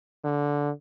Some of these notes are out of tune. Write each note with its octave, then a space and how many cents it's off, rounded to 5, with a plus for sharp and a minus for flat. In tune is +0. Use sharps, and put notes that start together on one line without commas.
D3 -15